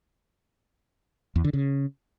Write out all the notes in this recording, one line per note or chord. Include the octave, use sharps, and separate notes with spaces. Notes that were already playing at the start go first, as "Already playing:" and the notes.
E2
D3
C#3